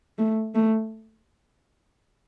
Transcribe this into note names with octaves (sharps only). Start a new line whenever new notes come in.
A3
A3